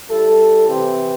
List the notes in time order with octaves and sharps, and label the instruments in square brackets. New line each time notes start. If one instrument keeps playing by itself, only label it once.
[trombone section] G3 E4 A4
C3 E3 C4 G4